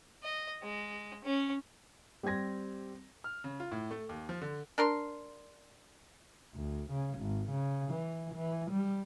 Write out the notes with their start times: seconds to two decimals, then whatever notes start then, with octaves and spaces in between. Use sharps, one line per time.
0.23 D#5
0.62 G#3
1.24 C#4
2.23 G3 C4 G4 G#6 A#6
3.24 F6
3.44 C#3
3.60 F4
3.72 A2
3.91 A3
4.09 D#2
4.29 F3
4.42 D3
4.78 D4 A#4 C6
6.55 D2
6.91 C#3
7.19 G#1
7.51 C#3
7.91 E3
8.35 E3
8.71 G3